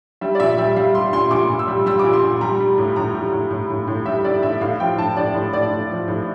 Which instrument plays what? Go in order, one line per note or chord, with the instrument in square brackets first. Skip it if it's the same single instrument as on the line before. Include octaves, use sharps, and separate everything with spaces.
[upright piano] G3 E5
D5
A#2 E5
G3 E5
G3 F5
G3 C6
A#2 C6
A#2 D6
A#2
E6
G3
G3 E6
A#2 D6
C6
A#2
G3 A#5
G3
A2
A2 A#5
G3
A2
A2
A2
A2
G3 E5
G3 D5
A2 E5
A2 F5
F3 G5
A2 A5
A2 D5
A2
A2 D5
A2
F3
A2